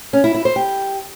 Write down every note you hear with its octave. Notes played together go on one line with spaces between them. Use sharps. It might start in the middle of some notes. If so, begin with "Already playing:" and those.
C#4
E4
E4
C5
G4